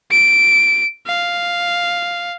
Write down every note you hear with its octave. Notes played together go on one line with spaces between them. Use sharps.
D7
F5